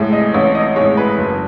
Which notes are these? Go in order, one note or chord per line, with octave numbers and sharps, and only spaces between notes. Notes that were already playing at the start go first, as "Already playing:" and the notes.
Already playing: A1 A2 G#3 E5
D#5
A1 C#5
D#5
A2 G#3 C#5
B4
F#1